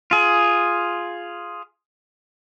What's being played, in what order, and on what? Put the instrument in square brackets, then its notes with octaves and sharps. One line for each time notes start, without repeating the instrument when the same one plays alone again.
[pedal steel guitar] F4 G#4